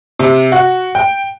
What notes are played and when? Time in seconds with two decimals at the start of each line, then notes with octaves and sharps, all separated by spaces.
0.19 C3
0.52 F#4
0.95 G5